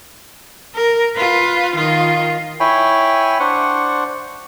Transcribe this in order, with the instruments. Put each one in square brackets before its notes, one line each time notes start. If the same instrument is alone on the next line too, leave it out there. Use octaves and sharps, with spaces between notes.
[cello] A#4
F4 B4
D#3 F4
[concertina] E4 C#5 G5 G#5 B5
D4 C5 F#5 C#6